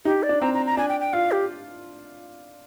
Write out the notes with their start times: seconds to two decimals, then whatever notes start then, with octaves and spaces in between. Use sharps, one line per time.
0.05 D#4 G4
0.23 D5
0.29 D4
0.41 C4 A#5
0.54 A#5
0.66 A#5
0.77 D4 G#5
0.89 G5
1.01 G5
1.13 F4 F5
1.32 G4